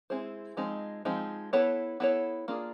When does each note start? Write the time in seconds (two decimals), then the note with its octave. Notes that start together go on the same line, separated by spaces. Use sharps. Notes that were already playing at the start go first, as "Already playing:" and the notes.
0.10 G#3 C4 E4 G#4 C5
0.57 F3 G#3 C4 D#4
1.05 F3 G#3 C4 D#4
1.53 B3 E4 A4 C#5
2.00 B3 E4 A4 C#5
2.48 A#3 D4 F4 G#4